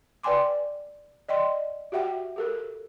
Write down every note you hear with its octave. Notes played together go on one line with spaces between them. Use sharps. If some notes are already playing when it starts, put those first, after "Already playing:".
B4 D5 G5 G#5 C6 D6
D5 D#5 G5 C6
F#4 G4 E5 F#5 G5
G4 A4 A#4